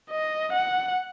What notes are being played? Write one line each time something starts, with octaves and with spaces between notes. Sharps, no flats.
D#5
F#5